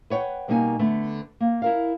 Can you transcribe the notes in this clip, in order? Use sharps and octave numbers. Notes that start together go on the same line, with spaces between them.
B4 C#5 F#5 G5
B2 G3 A#3 D#4 G5 G#5
D3 A3 B3
A#3
E4 A#4 F5